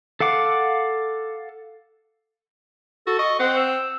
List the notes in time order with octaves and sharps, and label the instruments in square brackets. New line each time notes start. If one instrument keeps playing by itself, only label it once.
[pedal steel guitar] A4 F5 F#5 D6
[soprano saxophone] F#4 [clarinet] A4
[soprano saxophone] D#5 [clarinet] C#6
[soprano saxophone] C4 [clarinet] F#5
[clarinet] E6